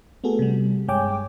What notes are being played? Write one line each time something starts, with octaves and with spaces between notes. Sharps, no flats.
A3 B3 F#4 G#4 A4
C3 G3
G2 G#3 C#5 G5 G#5 D6